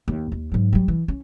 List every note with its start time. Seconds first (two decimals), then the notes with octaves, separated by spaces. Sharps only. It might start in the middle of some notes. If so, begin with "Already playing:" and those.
0.08 D#2
0.32 D#2
0.52 G#2 F#3
0.73 F#3 G3
0.88 E3
1.08 C#4